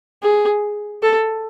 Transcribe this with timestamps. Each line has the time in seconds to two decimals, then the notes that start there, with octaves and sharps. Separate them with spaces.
0.23 G#4
1.03 A4